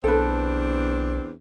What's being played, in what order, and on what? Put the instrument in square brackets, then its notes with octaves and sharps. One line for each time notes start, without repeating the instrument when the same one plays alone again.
[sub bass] B1 [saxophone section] E2 C4 D4 [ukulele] A4 B4